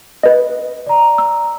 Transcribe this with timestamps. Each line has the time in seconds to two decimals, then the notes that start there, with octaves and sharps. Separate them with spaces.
0.23 B4 D#5
0.87 D5 A#5
1.18 E6